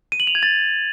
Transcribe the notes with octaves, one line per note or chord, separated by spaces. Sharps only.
D#7
F#7
F7
G#6
A6